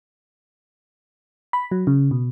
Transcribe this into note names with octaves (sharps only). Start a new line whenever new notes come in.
B5
F#3
C#3
B2